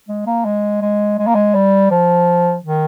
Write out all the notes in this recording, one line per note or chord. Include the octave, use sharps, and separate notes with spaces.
G#3
A#3
G#3
G#3
G#3
A#3
G#3
G3
F3
D#3